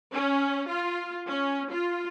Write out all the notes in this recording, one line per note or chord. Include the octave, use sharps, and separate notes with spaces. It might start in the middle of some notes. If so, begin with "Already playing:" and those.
C#4
F4
C#4
F4